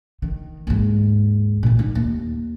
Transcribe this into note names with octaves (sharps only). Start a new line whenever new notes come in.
D#3
D#2 G#2
A#2 D#3
D#4
D#2